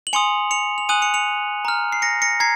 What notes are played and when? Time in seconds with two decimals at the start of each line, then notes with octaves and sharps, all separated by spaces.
0.07 F#7
0.13 G#5 C6 D#6 C#7 F7
0.51 C#7 F7
0.78 F7
0.89 G#5 D#6 F#6 D#7 F#7
1.02 C#7 F7
1.14 C#7 F7
1.65 A#5 F6
1.92 C7
2.02 A#6 C#7
2.22 A#6 C#7
2.40 A#5 G#6 C7